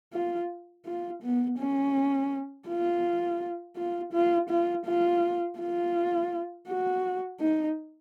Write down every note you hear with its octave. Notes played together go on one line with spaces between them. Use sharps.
F4
F4
B3
C#4
F4
F4
F4
F4
F4
F4
F#4
D#4